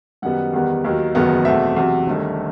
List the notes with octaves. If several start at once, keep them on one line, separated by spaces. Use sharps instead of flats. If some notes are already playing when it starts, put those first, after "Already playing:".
F#2 D#3 G3 B3 F#5
E2 D#3 G3 B3
D#2 D#3 F#3
F#1 E2 D#3 F#3 B3
E2 B2 A3 C4 E5
E2 C3 F#3
G1 G2 D#3 A3